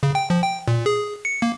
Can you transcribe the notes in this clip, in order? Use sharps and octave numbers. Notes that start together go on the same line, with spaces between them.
C#3
G5
F3
G5
A#2
G#4
C#7
A#3